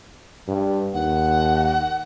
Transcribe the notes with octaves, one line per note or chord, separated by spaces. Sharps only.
G2
D#2 F#5